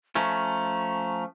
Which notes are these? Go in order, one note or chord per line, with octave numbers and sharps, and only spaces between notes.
F3 A3 C#4 A#5